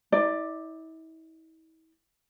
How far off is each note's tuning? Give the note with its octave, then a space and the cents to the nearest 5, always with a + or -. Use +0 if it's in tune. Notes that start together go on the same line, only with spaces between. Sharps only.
E4 -40 D5 +10